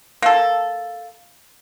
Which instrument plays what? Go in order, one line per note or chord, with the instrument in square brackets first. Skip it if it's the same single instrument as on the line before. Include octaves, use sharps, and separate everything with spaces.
[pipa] A#3 A4